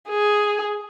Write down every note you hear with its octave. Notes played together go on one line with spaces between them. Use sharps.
G#4